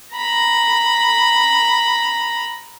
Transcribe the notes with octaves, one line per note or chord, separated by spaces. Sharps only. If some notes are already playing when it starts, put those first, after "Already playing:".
A#5 B5